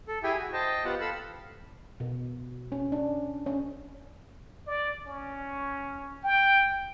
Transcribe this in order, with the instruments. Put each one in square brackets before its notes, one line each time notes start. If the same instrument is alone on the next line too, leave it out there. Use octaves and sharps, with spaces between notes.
[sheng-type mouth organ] A4
E4 G4 G#4 E5 G5 G#5
F#4
C5 D#5 G5 A5
B3 F4 G4 F#5
A4 F5 B5 E6
[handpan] B2
C#4
D4
C#4
[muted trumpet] D5
C#4
G5